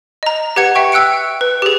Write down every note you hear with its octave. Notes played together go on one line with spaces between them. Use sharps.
D#5 A#5
G4 B4 F#5 G#6 C#7
E5 G5 C#6
G5 E6 F#6 C#7 D7
B4
G4 G#4